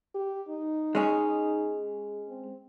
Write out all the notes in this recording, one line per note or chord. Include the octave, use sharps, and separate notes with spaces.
G4
D#4
G#3 C#4 G#4
C4